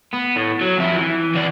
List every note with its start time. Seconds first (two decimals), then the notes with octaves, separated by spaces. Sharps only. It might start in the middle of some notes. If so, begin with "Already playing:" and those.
0.14 B3
0.37 A2
0.61 F#3
0.78 F2 E4
0.95 E3
1.35 E3 D5